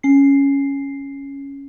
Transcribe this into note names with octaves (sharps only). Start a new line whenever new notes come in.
C#4 C7